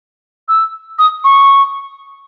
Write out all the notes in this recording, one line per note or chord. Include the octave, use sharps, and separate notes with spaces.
E6
D#6
C#6